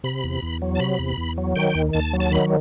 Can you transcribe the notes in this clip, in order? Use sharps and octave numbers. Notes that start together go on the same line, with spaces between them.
C3 B5
E2
E2
F#3
A5
C3 B5
E2
E2
F#3
D#3 G5
D#2
D#2 A5
F#3
A5
D#3 B5